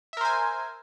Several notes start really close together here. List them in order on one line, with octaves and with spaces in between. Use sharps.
E5 A#4 C5 G#5